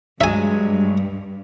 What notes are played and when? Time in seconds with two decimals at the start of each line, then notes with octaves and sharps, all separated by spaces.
0.21 G2 F#3 G#3 E5 G#5